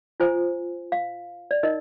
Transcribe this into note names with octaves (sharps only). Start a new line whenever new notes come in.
F4 C5 G#5
F5
D5
D#4 A#4 D#5